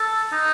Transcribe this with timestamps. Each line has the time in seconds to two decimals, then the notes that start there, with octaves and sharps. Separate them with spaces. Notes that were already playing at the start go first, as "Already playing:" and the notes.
Already playing: A4
0.33 D#4